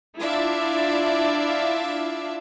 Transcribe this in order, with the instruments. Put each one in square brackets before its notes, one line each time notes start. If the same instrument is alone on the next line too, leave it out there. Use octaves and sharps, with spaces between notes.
[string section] D4 E4 F4 D5 E5 F5